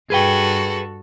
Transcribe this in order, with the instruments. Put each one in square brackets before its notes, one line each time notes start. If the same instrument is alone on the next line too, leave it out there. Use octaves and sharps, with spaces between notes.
[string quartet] G2 F#4 A4 [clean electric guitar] G#4 B4 G5